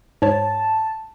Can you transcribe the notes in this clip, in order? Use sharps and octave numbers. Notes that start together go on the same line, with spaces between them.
G#2 C#5 A5